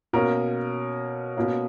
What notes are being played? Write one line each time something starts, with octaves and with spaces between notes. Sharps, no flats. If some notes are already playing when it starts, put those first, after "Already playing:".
B2 A#3 C#4 A#4
B2 A#3 C#4